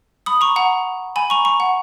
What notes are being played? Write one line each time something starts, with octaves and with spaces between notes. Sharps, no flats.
B5 D#6
A#5 C#6
F#5 A#5
G#5 B5
A#5 C#6
A#5 C#6
F#5